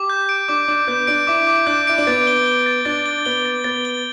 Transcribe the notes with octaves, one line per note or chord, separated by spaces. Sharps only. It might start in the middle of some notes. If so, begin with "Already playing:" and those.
Already playing: G4 D6
G6
D7
D4 D6
D4 D6
B3 G6
D4 D7
E4 D6
D6
D4 G6
E4 D7
D4
B3 A6
G7
G7
A6
D4 A6
G7
B3 G7
A6
B3 A6
G7